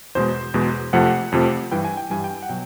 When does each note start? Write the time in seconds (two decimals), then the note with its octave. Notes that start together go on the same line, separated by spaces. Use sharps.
0.15 E2 B2 G#3 C5
0.54 E2 B2 G#3
0.93 F2 C3 F3 A3 F#5
1.32 F2 C3 F3 A3
1.71 G2 E3 G3 G5
1.85 G#5
1.97 G5
2.10 G2 E3 G3 G#5
2.24 G5
2.43 F#5
2.49 B2 F#3 G5